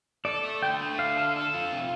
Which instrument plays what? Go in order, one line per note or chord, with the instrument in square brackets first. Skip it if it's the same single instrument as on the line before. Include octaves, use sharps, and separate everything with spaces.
[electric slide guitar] A4 [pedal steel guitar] D5
[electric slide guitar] A3
[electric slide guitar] D3 [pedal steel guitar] G5
[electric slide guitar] A3
[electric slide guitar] D3 [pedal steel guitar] F5
[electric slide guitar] A4
A4
F4
C3